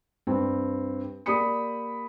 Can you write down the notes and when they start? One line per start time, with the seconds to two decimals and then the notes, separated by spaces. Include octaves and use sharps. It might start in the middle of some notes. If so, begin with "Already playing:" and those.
0.27 G2 C4
1.26 A#3 G4 D5 B5 D#6 C#7